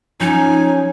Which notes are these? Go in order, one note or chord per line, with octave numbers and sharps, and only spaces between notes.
F3 C#4 D#4 G#5